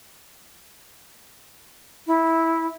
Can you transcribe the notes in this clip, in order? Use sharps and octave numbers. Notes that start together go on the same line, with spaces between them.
E4